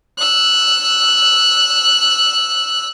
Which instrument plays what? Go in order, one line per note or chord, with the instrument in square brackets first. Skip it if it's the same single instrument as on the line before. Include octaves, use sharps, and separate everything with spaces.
[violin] E6 F#6